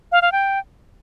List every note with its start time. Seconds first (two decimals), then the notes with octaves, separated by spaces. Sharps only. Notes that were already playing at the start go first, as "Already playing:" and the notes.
0.12 F5
0.22 F5
0.32 G5